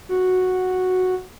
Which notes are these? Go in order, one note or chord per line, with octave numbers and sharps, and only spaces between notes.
F#4